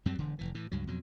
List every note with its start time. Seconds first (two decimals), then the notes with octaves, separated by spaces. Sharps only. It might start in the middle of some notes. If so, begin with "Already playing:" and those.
0.06 F#2 F#3 G3 C4
0.18 E1 D3
0.39 F1 A#1 E3
0.54 A2 E3
0.72 C#2 G2 F#3
0.87 F2 B2 F#3